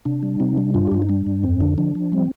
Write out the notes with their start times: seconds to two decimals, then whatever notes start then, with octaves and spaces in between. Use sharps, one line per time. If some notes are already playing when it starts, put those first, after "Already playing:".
0.05 C3 D4
0.23 G3
0.40 C3 C4 D#4
0.57 G3 D4
0.74 G2 D4 F4
0.87 G4
0.92 G2 F4
1.02 D#4
1.09 G3 D4
1.26 G2
1.43 F2 C4
1.60 D3 D4
1.78 F3 D4
1.95 F3
2.12 G3 C4